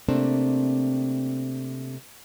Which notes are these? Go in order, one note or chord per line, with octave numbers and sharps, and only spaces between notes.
C3 A3 A#3 C4 D4